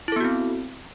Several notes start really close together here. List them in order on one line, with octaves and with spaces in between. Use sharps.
E4 A4 B3 F#4 C4